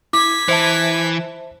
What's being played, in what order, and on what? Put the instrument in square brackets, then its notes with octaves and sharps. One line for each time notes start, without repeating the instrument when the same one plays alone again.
[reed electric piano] E4 [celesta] D6 [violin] G#6 B6
[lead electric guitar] E3 [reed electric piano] C5 E5 A5